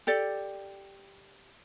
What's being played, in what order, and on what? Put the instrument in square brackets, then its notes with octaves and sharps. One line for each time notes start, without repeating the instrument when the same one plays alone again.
[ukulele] G4 A4 D5